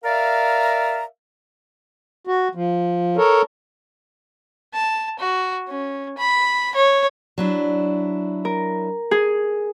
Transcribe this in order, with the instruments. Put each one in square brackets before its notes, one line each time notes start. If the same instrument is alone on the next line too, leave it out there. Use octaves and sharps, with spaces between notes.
[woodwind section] A#4 D5 E5 F5 A#5
[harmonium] F#4
F3
A4 A#4 C#5
[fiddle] A5
F#4
C#4
B5
C#5
[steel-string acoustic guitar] F#3 D4 E4
[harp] A#4
G#4